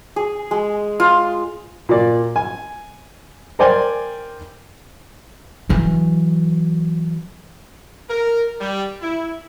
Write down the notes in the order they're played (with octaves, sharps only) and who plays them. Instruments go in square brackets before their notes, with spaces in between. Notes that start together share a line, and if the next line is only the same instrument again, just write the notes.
[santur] G#4
G#3
F4
[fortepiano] A#2 D5
G#5
A#4 C5 D5 G5 G#5
[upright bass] E3 F#3
[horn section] A#4
G3
E4